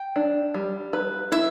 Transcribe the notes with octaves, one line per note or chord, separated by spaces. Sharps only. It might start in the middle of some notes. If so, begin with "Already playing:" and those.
Already playing: G5
D4
G3
B4
E4 E5